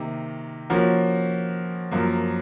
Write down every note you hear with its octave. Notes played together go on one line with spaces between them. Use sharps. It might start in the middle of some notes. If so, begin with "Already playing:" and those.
Already playing: C3 D#3 A#3
F3 A#3 C#4 F#4 A#4
F#2 F3 A#3